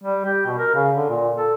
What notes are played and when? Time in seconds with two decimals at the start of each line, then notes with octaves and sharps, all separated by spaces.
0.04 G3
0.26 G4
0.46 B2
0.58 A#4
0.75 C#3
0.96 D3
1.10 A#2
1.37 A4